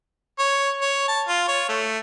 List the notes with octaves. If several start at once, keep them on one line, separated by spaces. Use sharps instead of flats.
C#5
C#5
A5
F4
C#5
A3